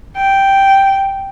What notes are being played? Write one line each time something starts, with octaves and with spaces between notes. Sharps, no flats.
G5